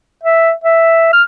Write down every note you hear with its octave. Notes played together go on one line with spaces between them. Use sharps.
E5
E5
F6